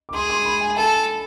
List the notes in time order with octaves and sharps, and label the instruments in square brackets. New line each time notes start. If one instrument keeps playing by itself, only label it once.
[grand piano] D6
[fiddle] G#4 [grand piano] C6
[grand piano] C6
B5
G#5
[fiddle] A4 [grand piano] A5